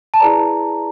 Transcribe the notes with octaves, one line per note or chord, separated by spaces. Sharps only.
A5
E4 G#4 B4 D5 A#5